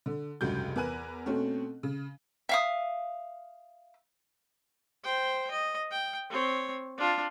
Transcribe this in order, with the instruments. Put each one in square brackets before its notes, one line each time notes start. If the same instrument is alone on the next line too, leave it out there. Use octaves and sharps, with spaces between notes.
[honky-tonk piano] D3
F1 C#2 G2 F#4 G6
E2 A#4 B4 G#5 F#6 D#7
B2 A3 C4 C#4
C#3
[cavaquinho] E5 F5 D#6
[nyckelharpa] C5 G5
D#5
G5
C4 C#5
D4 F4